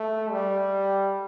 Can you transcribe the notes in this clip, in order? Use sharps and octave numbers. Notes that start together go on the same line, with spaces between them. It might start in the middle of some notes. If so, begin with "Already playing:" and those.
Already playing: A3
G3